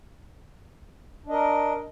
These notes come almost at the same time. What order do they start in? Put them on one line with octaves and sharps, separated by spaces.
D4 D#5 A#4